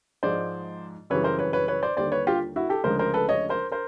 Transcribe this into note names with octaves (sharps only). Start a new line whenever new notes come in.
G#2 F3 G#3 C5 D5
F#2 C#3 E3 G3 B4 C#5
A#4 C5
B4 C#5
B4 C#5
B4 C#5
C5 D5
D#2 D3 G3 C5 D5
B4 C#5
F4 G4
E4 F#4
G4 A4
D2 C#3 F3 G#3 A#4 C5
A#4 C5
A4 B4
C#5 D#5
A#4 C5
A#4 C5